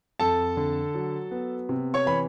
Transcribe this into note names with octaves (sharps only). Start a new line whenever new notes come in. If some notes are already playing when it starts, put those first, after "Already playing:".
F2 A4 A5
D3
F#3
B3
C3
C#5 C#6
E3 B5